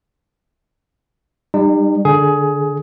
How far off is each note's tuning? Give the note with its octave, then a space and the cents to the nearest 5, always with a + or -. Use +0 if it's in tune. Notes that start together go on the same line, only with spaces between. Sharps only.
G3 +25 D#4 -35
D3 +0 G#4 +15